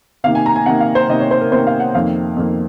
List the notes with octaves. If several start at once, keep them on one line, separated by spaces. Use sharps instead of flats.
C3 D#3 A#3 F5
G#5
A#5
G#5
C3 D#3 A#3 F#5
F5
C5
C3 D#3 A#3 D#5
C#5
C5
A#4
C3 D#3 A#3 C5
F5
F#5
F2 D#3 A#3 F5
F2 D#3 A#3